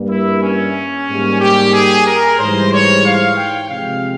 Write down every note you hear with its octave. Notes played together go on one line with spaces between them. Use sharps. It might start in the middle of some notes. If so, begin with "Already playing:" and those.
Already playing: G2 G3 A#3
E4
C#4
G#2 G3 A#3
G4
G#4
A#4
G#2 E3 G3 C5
C#5
F5
G5
C3 F3 G#3 C4 F5